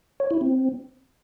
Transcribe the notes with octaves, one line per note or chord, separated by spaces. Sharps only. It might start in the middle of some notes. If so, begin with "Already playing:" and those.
C#5
E4
C4